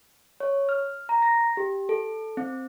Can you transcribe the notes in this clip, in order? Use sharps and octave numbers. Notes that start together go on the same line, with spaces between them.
C#5
F6
A#5
A#6
G4
A4
C4